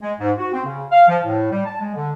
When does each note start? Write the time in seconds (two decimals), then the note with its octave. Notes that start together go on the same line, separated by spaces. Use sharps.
0.01 G#3
0.20 G#2
0.38 F#4
0.53 C4
0.65 C#3
0.91 F5
1.08 F3
1.24 A2
1.51 G3
1.66 A5
1.80 G#3
1.96 D3